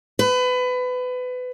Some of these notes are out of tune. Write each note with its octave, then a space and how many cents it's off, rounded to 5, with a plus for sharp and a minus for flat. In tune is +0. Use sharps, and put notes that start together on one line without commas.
B4 +25